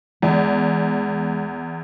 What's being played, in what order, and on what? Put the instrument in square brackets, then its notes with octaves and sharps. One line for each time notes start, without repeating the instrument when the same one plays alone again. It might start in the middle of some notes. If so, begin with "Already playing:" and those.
[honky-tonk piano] E2 [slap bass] G#3